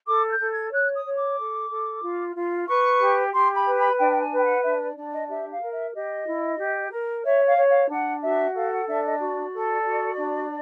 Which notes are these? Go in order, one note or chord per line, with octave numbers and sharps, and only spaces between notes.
A4 D6
G6
A4
G#6
C#5 F#6
D#6
C#5
D6
A4
A4
F4
F4
B4 C#6
G4
G4 C6
B5
B4
B5
D4 G5
G5
G#5
B4 G5
F#5
D4 E5
D5
D4 D5
D#5
G4 E5
F5
A#4
E5
G4 D#5
E4
G4
A#4
C#5 E5
F5
C#5
F5
D4 F#5
F#4 E5
A4 F5
F#5
D4 E5
D#5
F#4 D5
A4
F#4
D4